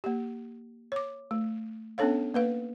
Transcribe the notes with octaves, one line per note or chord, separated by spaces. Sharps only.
A#3 G4
C#5 D6
A3
B3 C#4 D4 A4 C#5 F5
A#3 B4 F5